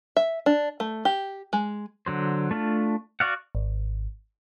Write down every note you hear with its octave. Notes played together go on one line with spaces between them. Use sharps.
E5
D4
A3
G4
G#3
D3 F#3 C5
A3 D4 F4
F#4 D5 F5 F#5
G#1